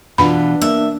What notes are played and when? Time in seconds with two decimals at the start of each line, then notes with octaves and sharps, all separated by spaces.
0.18 B2 E3 D4 F4 B5
0.62 A#3 E5